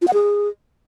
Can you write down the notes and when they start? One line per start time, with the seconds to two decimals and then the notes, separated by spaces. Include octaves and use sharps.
0.02 F4
0.08 F#5
0.13 G#4